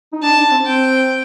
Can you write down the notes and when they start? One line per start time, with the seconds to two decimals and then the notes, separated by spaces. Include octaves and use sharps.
0.13 D#4
0.22 D4 A5
0.37 D4
0.51 C4
0.65 C4 G5